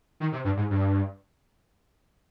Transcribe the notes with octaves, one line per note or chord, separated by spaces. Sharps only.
D#3
C3
G2
G#2
G2